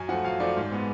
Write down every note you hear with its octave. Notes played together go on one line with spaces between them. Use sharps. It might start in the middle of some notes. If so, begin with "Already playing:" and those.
Already playing: F#2 G#5
F3 A3 F#5
F#2 F5
F3 A3 D5
G#2
G#3 B3